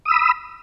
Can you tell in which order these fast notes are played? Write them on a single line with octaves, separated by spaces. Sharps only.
D#6 E6 B5